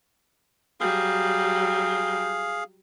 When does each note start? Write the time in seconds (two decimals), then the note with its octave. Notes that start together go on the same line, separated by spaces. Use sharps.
0.80 F#3 G3 G#4 F5